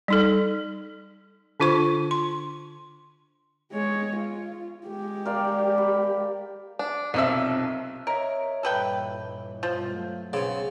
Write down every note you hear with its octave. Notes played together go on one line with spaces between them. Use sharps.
G3 D#4 A4
D3 D4 F4 C5 C#6
C6
G#3 C#5
F4
G#3 G4
A#4 D5 F5
B5
D4
B1 C3 D#3 F3 E5 E6
A#4 C#5 D#5 E5
G2 A#2 E3 A4 B4 G5
G2 B2 F3 G3
F#3 A3
B1 C#3 B3 C4 A6